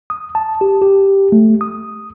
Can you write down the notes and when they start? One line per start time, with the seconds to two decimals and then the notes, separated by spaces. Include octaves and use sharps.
0.10 D#6
0.35 A5
0.61 G4
0.82 G4
1.32 A3
1.61 D#6